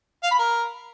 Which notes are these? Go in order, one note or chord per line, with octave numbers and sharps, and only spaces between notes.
F5
B5
A#4